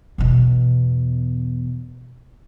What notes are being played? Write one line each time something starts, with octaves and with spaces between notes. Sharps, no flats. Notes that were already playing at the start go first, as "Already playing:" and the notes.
E2 B2